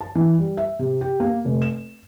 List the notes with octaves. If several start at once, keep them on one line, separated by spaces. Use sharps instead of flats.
A5
E3
G3
E5
C3
G4
A#3
F1
E7